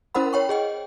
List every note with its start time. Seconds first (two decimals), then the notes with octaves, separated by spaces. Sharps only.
0.14 C#4 E4 A#4 C5 F#5 B5
0.33 C#5 G5 C#6
0.49 G#4 D#5 G5